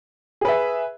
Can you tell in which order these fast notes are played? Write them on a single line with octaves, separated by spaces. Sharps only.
G#4 B4 E5